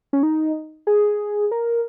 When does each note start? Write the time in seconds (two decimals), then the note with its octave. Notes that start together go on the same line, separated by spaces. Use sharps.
0.13 C#4
0.23 D#4
0.87 G#4
1.51 A#4